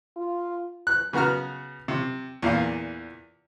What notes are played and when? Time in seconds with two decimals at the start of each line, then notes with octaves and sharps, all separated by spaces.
0.17 F4
0.87 F#6
1.13 C#3 B3 F#4 A#5 F6
1.88 C3
2.42 E2 A#2 F5